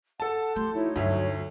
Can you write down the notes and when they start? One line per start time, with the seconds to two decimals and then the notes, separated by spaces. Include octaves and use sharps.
0.20 A4 F#5 A5
0.56 F3 A3 G4 C6 G6
0.74 D#4 E4 F#4 C#5
0.96 D2 G2 F#3 F4 E5